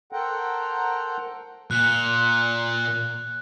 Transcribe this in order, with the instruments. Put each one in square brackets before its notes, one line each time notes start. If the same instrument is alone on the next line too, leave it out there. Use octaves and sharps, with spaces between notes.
[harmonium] A4 A#4 C5 F#5 G5 A#5
[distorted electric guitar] A#2 [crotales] F#6